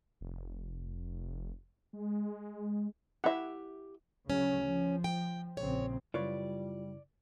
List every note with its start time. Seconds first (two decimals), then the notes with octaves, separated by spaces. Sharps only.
0.21 F1
1.93 G#3
3.24 E4 G4 E5 F#5
4.30 D2 C#3 F#3 C#4
4.64 F3
5.04 G5
5.57 A#1 C#3 C4 C#5
6.14 F#2 C#3 G3 E4 F4 B4 C#5 D5